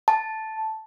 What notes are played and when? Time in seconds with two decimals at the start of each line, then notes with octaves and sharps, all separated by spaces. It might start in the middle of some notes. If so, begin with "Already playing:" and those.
0.08 A5